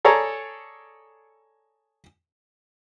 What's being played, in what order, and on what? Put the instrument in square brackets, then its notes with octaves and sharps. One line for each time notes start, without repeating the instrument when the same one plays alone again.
[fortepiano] G#4 A4 C#5 D5 A#5